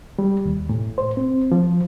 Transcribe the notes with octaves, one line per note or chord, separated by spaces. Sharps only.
G3
D#2
A2
C5
C4
F3